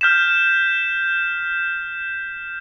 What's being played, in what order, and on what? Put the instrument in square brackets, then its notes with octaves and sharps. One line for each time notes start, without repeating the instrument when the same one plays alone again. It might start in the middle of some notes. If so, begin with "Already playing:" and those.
[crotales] F6 G6 B6 E7